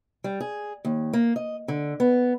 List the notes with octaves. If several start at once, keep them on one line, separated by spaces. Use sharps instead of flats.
G3
G#4
D#2
A#3
D#5
D3
B3